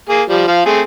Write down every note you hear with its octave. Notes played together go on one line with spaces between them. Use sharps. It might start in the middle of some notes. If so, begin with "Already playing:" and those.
A#3 G#4
F3 G3
F3 F5
A3 C4 G#4